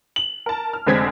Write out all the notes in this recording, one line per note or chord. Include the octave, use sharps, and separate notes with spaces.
F#7
A#4 A5
F6
F1 D3 G#3 C4 G#6 B6